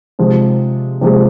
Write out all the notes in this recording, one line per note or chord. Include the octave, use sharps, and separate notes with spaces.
C3 F3 G#3
C3 F3 G#3